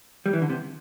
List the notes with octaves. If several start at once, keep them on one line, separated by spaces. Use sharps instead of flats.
G3
E3
D3
C3